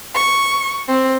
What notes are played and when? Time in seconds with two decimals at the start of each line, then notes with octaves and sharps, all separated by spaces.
0.13 C#6
0.88 C4